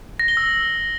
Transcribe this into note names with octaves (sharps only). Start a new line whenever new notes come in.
A#6
G7
E6